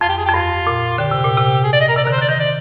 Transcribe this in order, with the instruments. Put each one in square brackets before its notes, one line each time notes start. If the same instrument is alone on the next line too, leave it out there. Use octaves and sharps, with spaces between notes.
[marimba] F2 [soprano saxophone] F4
[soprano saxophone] G4
G#4
[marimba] F2 [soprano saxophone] G4
[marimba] G2 [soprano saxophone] F4
[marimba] A#2
[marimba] D3 [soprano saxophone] G4
[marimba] C3
A#2
C3
[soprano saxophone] G#4
D5
D#5
A#4
[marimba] C3 [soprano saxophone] D5
[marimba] D3 [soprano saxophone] A#4
[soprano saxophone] C5
[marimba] D3
[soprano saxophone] D5
[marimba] D#3 [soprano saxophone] D#5
[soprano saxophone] D5